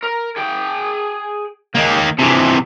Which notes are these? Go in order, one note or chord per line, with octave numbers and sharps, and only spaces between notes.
A#4
G#4 G5
C#2 D#3 A#3
C3 E3 F3 G#4